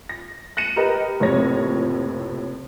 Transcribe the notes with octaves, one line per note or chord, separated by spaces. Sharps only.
A#6
F#6 A#6 C#7 D#7 E7
G4 A#4 B4 D#5
F#1 A2 C3 F3 C#5 A#6